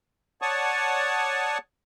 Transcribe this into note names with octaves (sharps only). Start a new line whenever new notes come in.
C#5 D5 F#5 A5 C#6 D#6